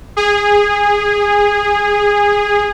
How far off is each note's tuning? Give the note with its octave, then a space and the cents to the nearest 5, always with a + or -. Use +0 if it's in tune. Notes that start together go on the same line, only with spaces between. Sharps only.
G#4 -20